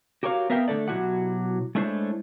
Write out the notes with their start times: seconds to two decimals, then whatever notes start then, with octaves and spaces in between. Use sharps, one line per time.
0.23 F#4 G4 A#4 C#5 D5 F5
0.50 B3 A#4 E5 F5 G5
0.68 D3 A3 A4 D5
0.88 B2 F#3 E4 F#4 G4 F#5
1.75 G#3 A3 D4 E4 C5 C#5